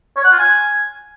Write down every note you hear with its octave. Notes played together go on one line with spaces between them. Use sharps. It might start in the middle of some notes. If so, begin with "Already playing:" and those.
C#5
F#5
F4
G#5